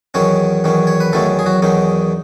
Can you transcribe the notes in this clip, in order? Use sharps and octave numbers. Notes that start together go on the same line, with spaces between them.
E2 D#3 F#3 C#4 C#5
E2 D#3 F#3 C#4
C#5
B4
E2 D#3 F#3 A3 C#4 A4
G#4
F#3 F#4
E2 D#3 F#3 C#4 D#4